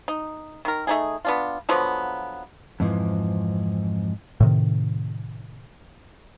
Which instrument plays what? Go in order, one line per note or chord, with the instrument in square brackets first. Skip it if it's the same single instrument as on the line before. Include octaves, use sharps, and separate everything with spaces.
[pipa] D#4
D#3 A#4
A3 D#4 G#4
B3 D4 F4
D3 F3 F#3 B3
[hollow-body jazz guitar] F2 G#2 E3 F3
[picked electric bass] A2 C3 D#3